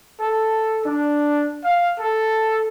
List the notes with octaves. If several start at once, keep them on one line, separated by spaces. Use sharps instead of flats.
A4
D4
F5
A4